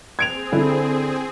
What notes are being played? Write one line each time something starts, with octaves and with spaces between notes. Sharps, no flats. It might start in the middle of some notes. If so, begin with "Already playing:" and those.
C4 G#4 G#6 D7 F7
D3 E4